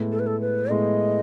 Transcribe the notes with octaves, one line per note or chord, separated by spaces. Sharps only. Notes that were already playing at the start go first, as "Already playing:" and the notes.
Already playing: A2 G#3 B3
A4
B4
A4
B4
A2 G#3 B3 D#5